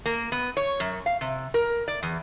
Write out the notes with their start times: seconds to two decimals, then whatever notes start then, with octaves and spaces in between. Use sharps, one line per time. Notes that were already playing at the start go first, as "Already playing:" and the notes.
0.06 A#3
0.32 B3
0.57 C#5
0.80 F#2
1.06 F5
1.21 C3
1.54 A#4
1.88 D5
2.03 E2